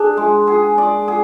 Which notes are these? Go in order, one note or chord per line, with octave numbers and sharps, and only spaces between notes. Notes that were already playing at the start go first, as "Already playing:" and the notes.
Already playing: D4 G#4
G#3
G#4
D5
G#4